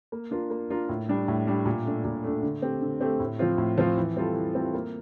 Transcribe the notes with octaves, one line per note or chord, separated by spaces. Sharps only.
A#3
D4 F4 A#4
A#3
D4 F4 A#4
A2
G3 D4
A2
G3 D4
A#2
A3 D4
A#2
A3 D4
D3
A3 C4 G4
D3
A3 C4 G4
A2
F3 C4 F4
A2
F3 C4 F4
E3
G3 C4 F4 A4
E3
G3 C4 F4 A4
A#3